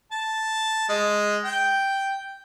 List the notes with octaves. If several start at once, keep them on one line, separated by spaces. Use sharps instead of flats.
A5
G#3
G5